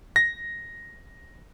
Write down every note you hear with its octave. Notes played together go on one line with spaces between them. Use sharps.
A#6